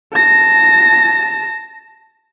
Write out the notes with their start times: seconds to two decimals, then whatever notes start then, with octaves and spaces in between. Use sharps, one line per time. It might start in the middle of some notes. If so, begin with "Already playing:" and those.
0.14 A5 A#6